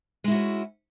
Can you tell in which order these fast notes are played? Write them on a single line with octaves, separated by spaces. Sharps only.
G#3 E4 F#4 C#4